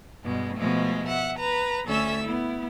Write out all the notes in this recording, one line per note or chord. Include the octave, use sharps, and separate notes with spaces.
G2 B2 G#3
B2 F3 G#3 A3
E5 F#5
B4 A#5
D2 C#4 A4 E5 E6
B3 E4